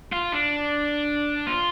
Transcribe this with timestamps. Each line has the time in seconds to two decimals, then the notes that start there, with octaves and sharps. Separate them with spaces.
0.12 F4
0.32 D4
1.47 F4